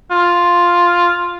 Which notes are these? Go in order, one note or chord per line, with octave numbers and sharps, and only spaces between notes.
F4